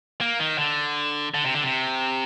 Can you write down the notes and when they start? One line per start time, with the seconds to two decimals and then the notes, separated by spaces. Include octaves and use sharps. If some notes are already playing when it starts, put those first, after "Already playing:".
0.21 A#3
0.40 D#3
0.58 D3
1.34 D3
1.45 C3
1.55 D3
1.63 C3